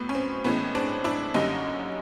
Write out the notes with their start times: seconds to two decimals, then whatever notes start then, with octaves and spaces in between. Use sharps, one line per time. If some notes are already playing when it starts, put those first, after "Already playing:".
Already playing: A2 F#3 B3
0.09 C#4
0.15 C4
0.44 A2 E3 G#3 B3 C#4
0.75 C4 D4
1.04 D4 E4
1.34 F#2 D3 G3 A#3 C#4 D#4